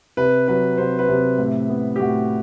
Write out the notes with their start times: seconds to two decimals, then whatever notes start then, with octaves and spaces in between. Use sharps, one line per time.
0.17 C3 B4
0.48 F#3 B4
0.78 C3 C5
0.99 B4
1.08 C3
1.38 A2
1.69 B3
1.96 G4
2.00 A2 F#4